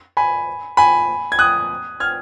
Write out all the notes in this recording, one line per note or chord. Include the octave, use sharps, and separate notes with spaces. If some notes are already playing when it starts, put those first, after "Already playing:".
G#5 B5
G#5 B5
G#6
D#6 F#6
F6 G#6